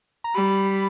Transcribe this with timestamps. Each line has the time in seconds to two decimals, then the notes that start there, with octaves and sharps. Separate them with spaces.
0.24 A#5
0.34 G3 B5